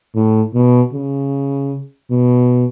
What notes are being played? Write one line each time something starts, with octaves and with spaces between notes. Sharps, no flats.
A2
B2
C#3
B2